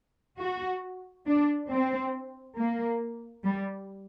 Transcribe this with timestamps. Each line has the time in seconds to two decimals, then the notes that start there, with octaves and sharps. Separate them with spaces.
0.39 F#4
1.26 D4
1.70 C4
2.56 A#3
3.44 G3